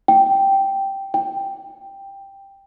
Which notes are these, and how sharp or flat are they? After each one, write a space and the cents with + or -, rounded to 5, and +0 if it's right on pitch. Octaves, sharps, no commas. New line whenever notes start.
G5 -5
G5 +5